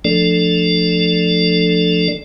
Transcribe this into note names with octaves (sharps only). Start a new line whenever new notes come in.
F3 A3 D4 A4 D5